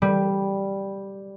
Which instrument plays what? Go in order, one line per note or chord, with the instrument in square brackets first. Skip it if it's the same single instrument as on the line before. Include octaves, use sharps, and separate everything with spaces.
[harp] G3